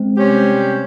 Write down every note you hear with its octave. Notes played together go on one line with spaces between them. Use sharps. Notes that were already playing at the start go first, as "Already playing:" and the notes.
Already playing: G#3 C4
C3 G3 C#4 G4 C5